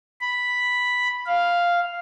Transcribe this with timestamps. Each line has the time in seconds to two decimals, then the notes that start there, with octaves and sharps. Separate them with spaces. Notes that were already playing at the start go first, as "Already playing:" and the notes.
0.21 B5
1.26 F5